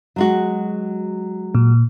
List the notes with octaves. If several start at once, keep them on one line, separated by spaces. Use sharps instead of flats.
F#3 G#3 F#4
A#2